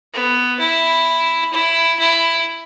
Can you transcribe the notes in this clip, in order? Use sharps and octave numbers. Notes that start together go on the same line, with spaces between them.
B3
E4
E4
E4